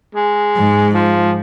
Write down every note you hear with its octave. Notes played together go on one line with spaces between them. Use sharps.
G#3
G#2
F3